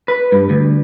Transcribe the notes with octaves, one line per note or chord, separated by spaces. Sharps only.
B4
G2
D2